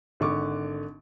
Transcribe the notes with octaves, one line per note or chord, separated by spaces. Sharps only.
G#1 D3 C#6 D6